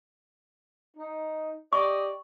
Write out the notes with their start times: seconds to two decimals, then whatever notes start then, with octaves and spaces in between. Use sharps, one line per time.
0.97 D#4
1.73 G4 D5 D#5 C#6